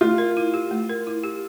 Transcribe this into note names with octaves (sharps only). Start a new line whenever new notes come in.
A3 F4
A#4
E4
G4
A3
A#4
E4
G4